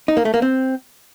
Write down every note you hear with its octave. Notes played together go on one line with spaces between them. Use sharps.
D#4
A#3
A3
A#3
C4